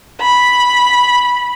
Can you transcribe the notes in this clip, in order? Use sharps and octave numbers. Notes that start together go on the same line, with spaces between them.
B5